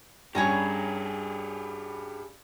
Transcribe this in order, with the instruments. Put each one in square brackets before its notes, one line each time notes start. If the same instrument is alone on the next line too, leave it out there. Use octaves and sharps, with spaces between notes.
[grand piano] G2 G3 C#4 [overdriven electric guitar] G4 G#4 [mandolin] C#5 G#5 A#5